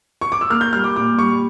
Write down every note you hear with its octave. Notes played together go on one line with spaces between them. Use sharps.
C#6
D6
E6
A#3 F6
G6
G3 F6
D6
A#2 D6
G3 C#6